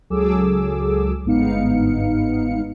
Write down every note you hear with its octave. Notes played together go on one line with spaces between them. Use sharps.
C#2 F#3 G#4 A4 D6 E6
G1 G#2 B3 D#4 F5 C#7